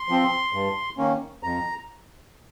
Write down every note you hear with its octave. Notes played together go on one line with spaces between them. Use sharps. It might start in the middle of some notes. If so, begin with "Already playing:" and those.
Already playing: C6
F3 C4
G2
D#3 A#3 C#4
F2 A#5